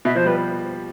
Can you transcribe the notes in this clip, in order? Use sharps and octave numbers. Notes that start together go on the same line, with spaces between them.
B2 E5
F3 C5
G3 B4